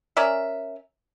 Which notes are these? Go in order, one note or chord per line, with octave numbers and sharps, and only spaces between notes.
C#4 A#4 D5 E5